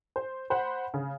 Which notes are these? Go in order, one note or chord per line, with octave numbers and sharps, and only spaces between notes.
C5
C5 F#5 B5
C#3